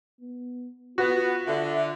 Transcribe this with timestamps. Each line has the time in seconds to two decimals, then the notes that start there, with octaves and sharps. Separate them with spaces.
0.21 B3
0.98 B3 F4 F#4
1.47 D3 E5